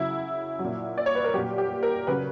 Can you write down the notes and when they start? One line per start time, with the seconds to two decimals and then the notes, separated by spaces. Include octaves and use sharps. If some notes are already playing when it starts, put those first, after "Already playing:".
Already playing: C#3 F#3 E4
0.59 F#3
0.64 A#2
0.97 D5
1.06 C#5
1.15 B4
1.24 A#4
1.34 A#2 F#3 G4
1.58 G4
1.83 A#4
2.07 C#3 F#3 B4